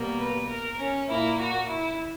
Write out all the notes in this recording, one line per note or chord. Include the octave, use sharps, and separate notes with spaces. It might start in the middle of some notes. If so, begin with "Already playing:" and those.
Already playing: B2 G3 A#3
B4
A#4
C#4
A#2 A#3 E4
F#4
E4